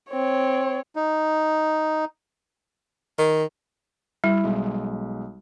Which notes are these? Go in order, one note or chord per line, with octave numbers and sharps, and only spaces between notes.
C4 C#5
D#4
D#3
G3 E4
B1 G#3